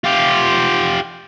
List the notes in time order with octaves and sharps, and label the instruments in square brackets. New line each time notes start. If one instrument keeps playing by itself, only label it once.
[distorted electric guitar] F4 G4